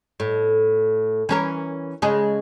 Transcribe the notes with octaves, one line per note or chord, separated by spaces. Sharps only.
A2
E3 C#4 A#4
C#3 G#3 G#4